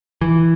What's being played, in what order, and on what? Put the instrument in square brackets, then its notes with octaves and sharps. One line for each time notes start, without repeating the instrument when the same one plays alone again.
[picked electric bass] E3